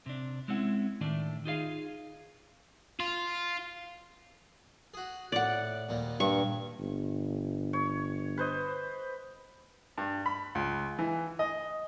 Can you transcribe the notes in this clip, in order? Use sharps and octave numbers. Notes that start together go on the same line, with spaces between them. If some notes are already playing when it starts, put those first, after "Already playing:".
C3 D4
G#3 C4 C#4 E4 F#5
A2 D#3 A3 D4 D5
D#4 F4 G#4 C5 F5
F4
F#4 G#4
A2 D5 F#5
D#2 A#2 G3
G2 C#6
G1
C#5
B4 C5 D#5
G2
B5
C#2
E3
D#5